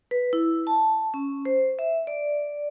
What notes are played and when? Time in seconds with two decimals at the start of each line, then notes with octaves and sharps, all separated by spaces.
0.11 B4
0.33 E4
0.67 A5
1.14 C#4
1.45 C5
1.79 E5
2.07 D5